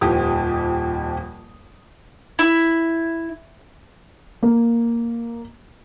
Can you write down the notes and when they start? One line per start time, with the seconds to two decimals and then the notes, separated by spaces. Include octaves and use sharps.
0.01 D#1 F2 F3 G4 D#6
2.39 E4
4.43 A#3